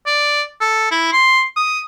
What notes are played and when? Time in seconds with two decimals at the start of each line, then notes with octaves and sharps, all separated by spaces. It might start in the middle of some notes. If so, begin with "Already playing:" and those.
0.07 D5
0.61 A4
0.91 E4
1.13 C6
1.57 D#6